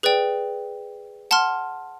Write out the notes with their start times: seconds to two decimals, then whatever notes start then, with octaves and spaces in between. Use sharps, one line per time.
0.03 G#4 B4 D5 G5
1.31 F#5 A5 C6 F6